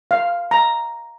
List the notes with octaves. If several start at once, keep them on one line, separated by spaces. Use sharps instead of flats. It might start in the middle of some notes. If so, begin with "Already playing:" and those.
F5
A#5